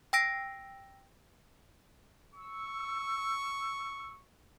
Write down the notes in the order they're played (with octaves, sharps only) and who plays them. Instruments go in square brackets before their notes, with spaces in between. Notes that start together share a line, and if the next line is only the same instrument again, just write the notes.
[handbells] G5 E6 A#6 D7
[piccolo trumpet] C#6 [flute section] E6